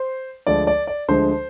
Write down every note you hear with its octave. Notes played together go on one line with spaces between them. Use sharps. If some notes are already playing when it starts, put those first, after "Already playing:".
Already playing: C5
D2 D3 F3 G#3 D5
D5
D5
D2 D3 F3 G#3 C5